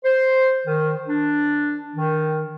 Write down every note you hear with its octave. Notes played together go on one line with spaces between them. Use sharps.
C5
D#3
D4
D#3